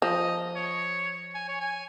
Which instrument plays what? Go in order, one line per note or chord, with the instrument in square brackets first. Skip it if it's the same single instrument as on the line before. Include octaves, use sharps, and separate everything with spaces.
[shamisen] F3 [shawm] D#5
[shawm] C#5
G#5
C#5
G#5